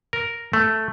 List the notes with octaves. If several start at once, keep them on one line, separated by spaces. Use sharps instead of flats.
A#4
A3